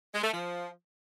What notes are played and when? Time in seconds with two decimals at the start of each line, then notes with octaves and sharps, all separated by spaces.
0.14 G#3
0.24 A3
0.33 F3